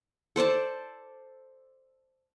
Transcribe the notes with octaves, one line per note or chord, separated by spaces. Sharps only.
A4 C5 D5 A5